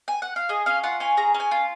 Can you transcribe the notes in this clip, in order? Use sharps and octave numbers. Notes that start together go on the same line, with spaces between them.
G#5
F#5
F5
G#4 D#5
C#4 F5
F4 F#5
C#4 G#5
G#4 A#5
C#4
G#5
F4